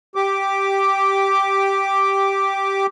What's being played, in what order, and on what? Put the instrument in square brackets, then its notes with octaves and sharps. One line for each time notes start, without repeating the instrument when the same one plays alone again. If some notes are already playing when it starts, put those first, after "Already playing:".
[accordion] G4 D6